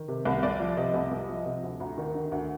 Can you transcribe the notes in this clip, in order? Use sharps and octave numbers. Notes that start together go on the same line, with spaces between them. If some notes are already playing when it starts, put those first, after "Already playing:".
Already playing: D#3
C3
C2
C2 D5
F3
C3 D#5
C2
C2
F3
C3
D2
D2 A#5
D#3
D3
D2